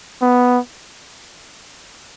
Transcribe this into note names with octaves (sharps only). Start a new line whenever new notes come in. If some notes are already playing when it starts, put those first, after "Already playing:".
B3